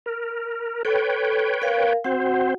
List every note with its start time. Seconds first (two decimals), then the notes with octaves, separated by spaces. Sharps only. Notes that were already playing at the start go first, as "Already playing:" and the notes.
0.06 A#4
0.85 A4 B4 C#5 G5
1.62 A#4 F5
2.04 C4 F#4 C5 F#5